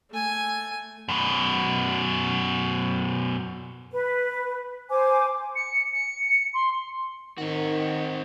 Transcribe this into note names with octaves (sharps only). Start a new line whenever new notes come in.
A3 G#5
F#2 B2
B4
C5 G#5 D6
C#7
C#7
C6
D#3 C4 F#4